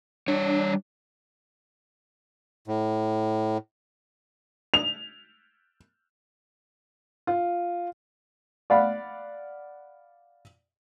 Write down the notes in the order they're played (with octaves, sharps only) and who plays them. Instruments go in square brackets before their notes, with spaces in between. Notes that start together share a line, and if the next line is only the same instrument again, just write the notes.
[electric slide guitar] G3 C#5 [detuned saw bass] D4
[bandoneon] A2
[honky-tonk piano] F7
[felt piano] F4
[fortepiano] D5 F5 F#5 B5